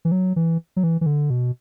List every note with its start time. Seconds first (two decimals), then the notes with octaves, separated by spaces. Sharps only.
0.05 E3
0.12 F#3
0.36 E3
0.76 F#3
0.83 E3
1.01 E3
1.06 D3
1.30 B2